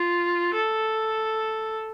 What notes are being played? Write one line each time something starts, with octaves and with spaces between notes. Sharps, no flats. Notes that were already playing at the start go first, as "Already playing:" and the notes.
Already playing: F4
A4